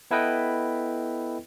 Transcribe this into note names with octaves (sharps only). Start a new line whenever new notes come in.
B3 E4 A4 B4 D#5 G5